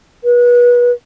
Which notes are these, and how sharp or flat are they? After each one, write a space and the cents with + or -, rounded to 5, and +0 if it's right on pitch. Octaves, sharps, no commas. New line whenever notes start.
B4 -30